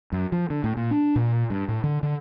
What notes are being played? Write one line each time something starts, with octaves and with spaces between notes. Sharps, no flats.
F#2
F3
D3
A2
A#2
D4
A#2
G2
A2
D3
D3